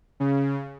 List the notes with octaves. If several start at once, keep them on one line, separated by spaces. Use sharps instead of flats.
C#3